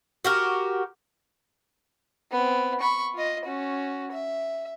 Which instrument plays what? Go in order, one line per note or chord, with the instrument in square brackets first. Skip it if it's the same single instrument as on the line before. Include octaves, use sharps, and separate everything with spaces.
[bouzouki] F#4 G4 A#4
[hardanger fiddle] B3 C4
B5 C#6
F4 D#5
C#4 F#4
E5